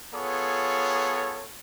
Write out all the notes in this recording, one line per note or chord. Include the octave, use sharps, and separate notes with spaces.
B3 F4 G#4 A4 C#5